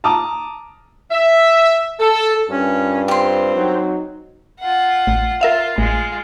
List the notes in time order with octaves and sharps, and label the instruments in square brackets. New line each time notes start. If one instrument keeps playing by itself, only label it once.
[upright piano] A5 A#5 D6 D#6
[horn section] E5
A4
[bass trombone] G2 [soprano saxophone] C#4 [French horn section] F4 A#4 B4
[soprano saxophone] C4 [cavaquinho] G4 C6
[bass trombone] F#3 [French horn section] D#4
[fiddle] F4 F#5
[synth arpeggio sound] A1
[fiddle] F4 [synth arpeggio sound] A#4 E5 F5
[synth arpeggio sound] A1 [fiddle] G#3 F4